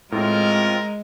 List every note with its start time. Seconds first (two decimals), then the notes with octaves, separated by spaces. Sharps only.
0.12 A2 G#3 C4 F4 A#4